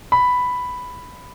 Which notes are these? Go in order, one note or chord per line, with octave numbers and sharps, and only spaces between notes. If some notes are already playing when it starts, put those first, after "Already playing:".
B5